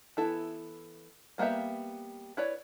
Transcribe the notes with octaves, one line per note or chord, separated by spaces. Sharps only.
E3 B3 E4 A4
G3 A#3 B3 G4 E5
E4 B4 C#5 D5